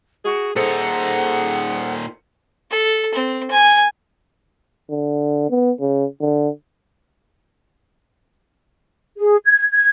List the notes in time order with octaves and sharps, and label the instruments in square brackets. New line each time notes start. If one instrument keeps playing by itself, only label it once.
[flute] F#4 [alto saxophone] G#4
[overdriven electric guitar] A#2 D#4 [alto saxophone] G#4 [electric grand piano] A4 C5 C#7 [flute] F#5
[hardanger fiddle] A4
C4
G#5
[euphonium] D3
B3
C#3
D3
[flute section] G#4
G#6
G#6